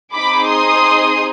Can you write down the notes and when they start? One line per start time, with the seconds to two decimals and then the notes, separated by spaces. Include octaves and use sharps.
0.13 C4 D#4 G#4 B5 D6
0.48 C6 D#6